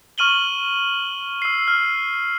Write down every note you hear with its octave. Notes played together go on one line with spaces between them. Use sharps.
C#6 F6 D#7 F#7 G7
E6 C7
F6